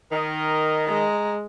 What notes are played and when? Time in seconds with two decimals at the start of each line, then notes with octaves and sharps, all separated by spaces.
0.12 D#3 A#4 D#5
0.88 G#3 A#5